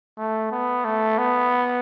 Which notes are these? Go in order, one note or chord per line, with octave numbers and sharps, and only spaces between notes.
A3
B3
A3
B3